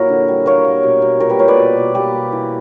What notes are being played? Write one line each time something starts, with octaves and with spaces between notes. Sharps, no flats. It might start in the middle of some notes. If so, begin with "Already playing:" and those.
Already playing: A#2 F#3 A#3 E4 A#4 C#5
D3
G3
A#3 A#4 C#5
A#3
B2
B2
A#2 A#4 C#5
G4 B4
A#2 A#4 C#5
B4 D5
B2
B2
A#3 G4 B4
B2
E3